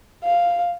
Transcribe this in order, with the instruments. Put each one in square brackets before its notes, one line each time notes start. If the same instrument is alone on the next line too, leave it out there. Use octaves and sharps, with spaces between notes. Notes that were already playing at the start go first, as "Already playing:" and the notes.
[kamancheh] F5